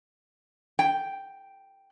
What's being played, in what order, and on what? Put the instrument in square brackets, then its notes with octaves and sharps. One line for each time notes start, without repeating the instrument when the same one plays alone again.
[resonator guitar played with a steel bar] G5